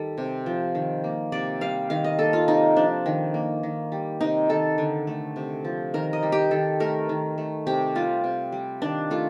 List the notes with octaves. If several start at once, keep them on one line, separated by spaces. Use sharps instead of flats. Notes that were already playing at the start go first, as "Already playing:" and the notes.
Already playing: D#3 G3 A4
C3
F3
D#3
A#3
C3 D5
G3 F5
D#3 F5
D#5
A#3 A4
F4
C3 D#4
F3 D4
D#3
A#3
D#3
G3
C3 D#4
D#3 A4
D3
A3
C3
F3
D#3 A#4
D#5
G3
G4
D#3 A4
A3 A#4
D#3
A3
C3 G4
G3 F4
C3
G3
D#3 D4
A3 F4